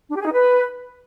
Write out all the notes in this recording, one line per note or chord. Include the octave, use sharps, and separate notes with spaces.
D4
G4
G#4
D#4
B4